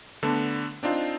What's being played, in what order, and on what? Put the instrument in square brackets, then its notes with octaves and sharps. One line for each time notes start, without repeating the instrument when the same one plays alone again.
[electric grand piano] D3 A3 B3 D4
C4 D4 D#4 F4